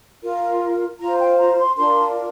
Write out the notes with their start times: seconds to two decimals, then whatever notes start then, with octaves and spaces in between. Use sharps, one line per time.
0.22 F4 A#4
1.00 F4 C5 A#5
1.19 G5
1.39 A#5
1.58 C6
1.77 D4 F4 A#4 C6